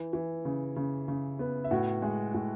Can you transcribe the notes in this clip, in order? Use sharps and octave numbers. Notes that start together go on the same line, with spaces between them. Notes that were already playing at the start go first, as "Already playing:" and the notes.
Already playing: E3
E3
C#3
C#3
C#3
B3
E5
A2 F#4 F#5
G#3
A2